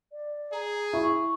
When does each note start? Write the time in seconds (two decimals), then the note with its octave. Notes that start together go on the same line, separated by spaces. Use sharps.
0.12 D5
0.53 G#4 A#5
0.93 E4 C#6